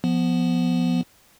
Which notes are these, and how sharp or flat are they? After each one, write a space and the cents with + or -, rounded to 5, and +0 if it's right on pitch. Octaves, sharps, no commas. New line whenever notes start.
F3 +0 B3 +0